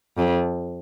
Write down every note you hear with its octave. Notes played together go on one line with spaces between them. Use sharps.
F2